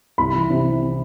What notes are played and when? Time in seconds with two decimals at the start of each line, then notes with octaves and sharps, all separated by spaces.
0.18 C2 B5
0.35 E3
0.50 C3